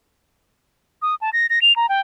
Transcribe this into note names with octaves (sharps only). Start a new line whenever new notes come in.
D#6
A5
A#6
A#6
F7
A#5
G5